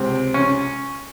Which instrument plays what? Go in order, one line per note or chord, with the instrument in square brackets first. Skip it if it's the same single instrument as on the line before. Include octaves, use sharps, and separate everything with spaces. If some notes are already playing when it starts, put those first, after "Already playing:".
Already playing: [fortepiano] C#2 C3 C4
C#4